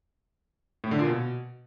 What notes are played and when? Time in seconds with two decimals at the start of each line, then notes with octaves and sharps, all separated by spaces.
0.84 A2
0.91 D3
0.99 A#2
1.06 B2